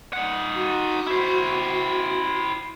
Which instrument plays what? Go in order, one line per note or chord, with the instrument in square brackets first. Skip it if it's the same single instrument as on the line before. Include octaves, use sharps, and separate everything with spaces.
[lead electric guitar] D#4 F#5
[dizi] F#4
[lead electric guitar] E4 C5